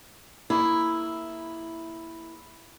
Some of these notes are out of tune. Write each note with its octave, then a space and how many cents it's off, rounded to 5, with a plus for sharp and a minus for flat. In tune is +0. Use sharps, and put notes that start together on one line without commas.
A#3 +0 E4 +0 G#4 +0